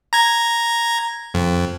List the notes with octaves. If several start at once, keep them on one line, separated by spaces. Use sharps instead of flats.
A#5 G#6
F2